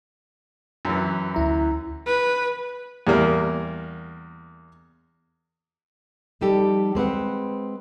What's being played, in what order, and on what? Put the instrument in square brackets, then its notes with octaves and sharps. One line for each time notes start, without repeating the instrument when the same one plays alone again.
[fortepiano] F#2 E3
[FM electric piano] D2 E4 A#5
[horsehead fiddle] B4
[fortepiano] E2 G3 A#3 A#4
[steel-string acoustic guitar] F3 G3 D#4 G4 A4
G#3 C4 B4 F#5